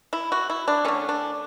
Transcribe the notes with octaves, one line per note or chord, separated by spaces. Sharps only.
E4
F#4
E4
D4
D3 A3 C#4
D4